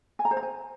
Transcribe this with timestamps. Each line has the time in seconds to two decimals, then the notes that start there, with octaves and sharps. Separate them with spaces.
0.19 G#5
0.25 A#5
0.31 C5
0.37 A#5
0.43 G#5